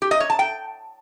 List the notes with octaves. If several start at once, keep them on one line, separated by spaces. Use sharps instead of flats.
G4
D#5
C#5
A5
G5